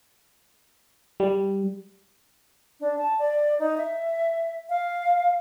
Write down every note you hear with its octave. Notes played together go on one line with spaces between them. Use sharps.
G3
D4
A5
D5
D#4
E5
F5